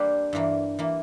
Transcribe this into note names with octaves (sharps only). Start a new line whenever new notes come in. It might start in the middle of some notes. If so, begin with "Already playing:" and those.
Already playing: G3 A#3 D4 G4 C5
G2 E3 A#3
E3 A#3